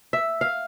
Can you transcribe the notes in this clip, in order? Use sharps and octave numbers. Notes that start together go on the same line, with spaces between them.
E5
F5